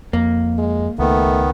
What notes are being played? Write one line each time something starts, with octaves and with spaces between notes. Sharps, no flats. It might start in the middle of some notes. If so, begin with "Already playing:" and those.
F2 A#3
G#3
C#2 D#3 A3 B3